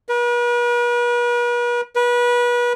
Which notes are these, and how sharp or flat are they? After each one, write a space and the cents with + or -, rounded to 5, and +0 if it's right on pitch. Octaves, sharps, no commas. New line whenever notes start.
B4 -45
B4 -30